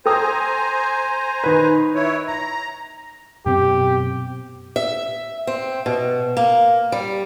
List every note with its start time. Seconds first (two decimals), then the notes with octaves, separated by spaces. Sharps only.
0.06 A4 C5 G5 G#5 A#5 D#6
1.44 D#3 B4
1.95 E4 C#5
2.28 A#5
3.46 F#2 B2 C4 G4
4.76 E5
5.47 C4
5.86 B2
6.37 A#3
6.92 G3